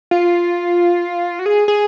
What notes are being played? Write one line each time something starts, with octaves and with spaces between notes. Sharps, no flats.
F4
F#4
G#4
G#4